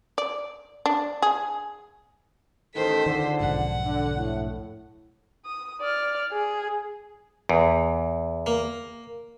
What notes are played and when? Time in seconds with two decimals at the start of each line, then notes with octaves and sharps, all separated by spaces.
0.18 D5
0.86 D4
1.22 G#4
2.75 A1 D#3 A4 C5 B6
3.06 C#2 D3 D#3
3.40 B1 F2 G#2 F#5
3.85 D3
4.16 A2
5.46 D#6
5.81 D5 F6
6.32 G#4
7.49 E2
8.46 A#3